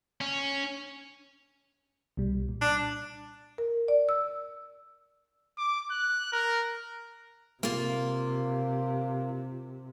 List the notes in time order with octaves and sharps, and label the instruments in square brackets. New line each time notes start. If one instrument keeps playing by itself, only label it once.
[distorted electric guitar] C#4
[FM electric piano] C2 B2 G3
A#2
[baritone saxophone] D4
[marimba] A#4
D5
E6
[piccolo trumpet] D6
F#6
A#4
[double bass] C3 [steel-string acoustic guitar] A#3 F4